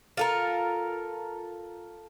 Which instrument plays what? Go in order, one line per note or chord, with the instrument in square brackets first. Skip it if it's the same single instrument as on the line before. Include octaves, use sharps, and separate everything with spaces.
[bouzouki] F4 A4 A#4